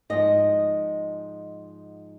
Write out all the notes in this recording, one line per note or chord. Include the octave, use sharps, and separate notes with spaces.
G#2 F3 D#5